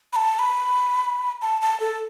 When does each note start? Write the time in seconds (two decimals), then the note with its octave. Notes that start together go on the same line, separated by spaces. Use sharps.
0.13 B5
0.16 A5
0.39 B5
1.42 A5
1.62 A5
1.80 A4